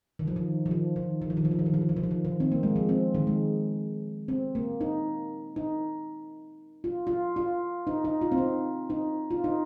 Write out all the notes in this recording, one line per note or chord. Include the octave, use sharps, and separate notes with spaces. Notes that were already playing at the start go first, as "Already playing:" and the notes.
D#3
F3
D#3
F3
D#3
D#3
D#3
F3
D#3
F3
D#3
F3
D#3
F3
D#3
F3
D#3
F3
D#3
D#3
C4
A#3
G#3
F3
C4
D#3
G#3
C4
A#3
D#4
D#4
F4
F4
F4
D#4
D#4
F4
C4
D#4
D#4
F4
D#4